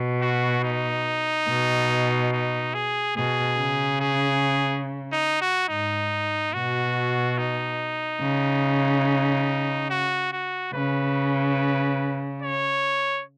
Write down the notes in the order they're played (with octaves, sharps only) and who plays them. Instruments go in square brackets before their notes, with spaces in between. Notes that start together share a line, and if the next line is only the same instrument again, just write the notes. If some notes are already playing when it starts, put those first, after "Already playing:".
Already playing: [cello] B2
[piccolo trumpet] F#4
D#4
[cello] B2
[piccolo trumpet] D#4
G#4
[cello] B2 [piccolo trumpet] G#4
[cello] C#3
[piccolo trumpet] G#4
D#4
F#4
[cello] G#2 [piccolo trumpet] D#4
[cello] B2 [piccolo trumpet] F#4
[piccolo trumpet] D#4
[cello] C#3
[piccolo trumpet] F#4
F#4
[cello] C#3 [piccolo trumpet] B4
[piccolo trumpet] C#5